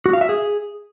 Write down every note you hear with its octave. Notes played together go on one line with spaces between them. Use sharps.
F#4
F5
E5
G#4